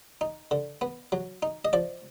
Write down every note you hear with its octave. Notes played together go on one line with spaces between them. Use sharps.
D#4
D3
B3
F#3
D#4
D#5
F3 D5